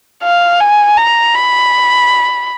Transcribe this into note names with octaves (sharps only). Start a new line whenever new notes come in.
F5
G#5
A#5
B5